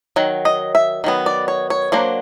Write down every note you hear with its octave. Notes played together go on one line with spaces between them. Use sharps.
D#3 F#3
D#5
E5
D#3 F#3 B3
D5
C#5
C#5
F#3 A#3 D4 C5